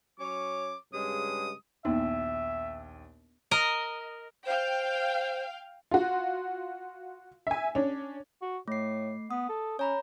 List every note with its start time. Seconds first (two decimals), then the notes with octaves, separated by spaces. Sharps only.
0.20 F#3 C#4 C#5 D6
0.93 G2 C#3 G#3 D#6
1.85 A#1 D#2 B3 D#4 E5
3.51 A#4 D#5
4.46 C5 F5 G5
5.91 F4 F#4
7.47 E5 G#5
7.75 C#4 D4
8.42 F#4
8.68 A2 A3 C7
9.31 B3 D#6
9.49 A4
9.79 C#4 C#5 A#5 B5